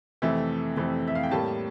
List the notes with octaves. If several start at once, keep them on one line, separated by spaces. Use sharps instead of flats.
F2 C3 E3 A3 E5
F2 C3 E3 A3
E5
F5
G5
A2 G3 A#3 A5